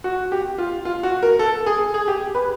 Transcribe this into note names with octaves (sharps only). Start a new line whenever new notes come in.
F#4
G4
F4
F4
F#4
A#4
A4
G#4
G#4
G4
B4